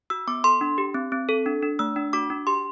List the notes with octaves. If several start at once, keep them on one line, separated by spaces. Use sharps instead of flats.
F#4 E6
B3 D6
A4 C6
D4
G4
C4
C4
A4
D4
D4
A3 E6
D4
F#4 D6
D4
G4 C6